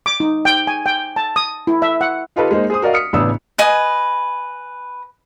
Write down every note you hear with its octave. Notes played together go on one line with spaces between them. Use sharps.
D6
D#4
G5
G#5
G5
A5
D#6
E4
E5
F#5
D#4 F4 G4 A4 B4 D#5
G#3 A#3 D#4 C5
G#4 C5 D#6
F#4 A#4 D5 D#5 F5
D#6 F6 B6 C#7
A1 C#3 B3 D4 D#6 E6
B4 D#5 G#5 D#6